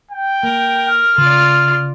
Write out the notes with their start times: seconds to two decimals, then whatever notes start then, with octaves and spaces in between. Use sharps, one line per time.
0.11 G5
0.43 A#3 A#4
0.88 F6
1.18 C#3 F4 D5